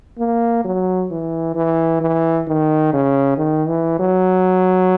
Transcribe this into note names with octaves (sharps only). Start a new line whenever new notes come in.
A#3
F#3
E3
E3
E3
D#3
C#3
D#3
E3
F#3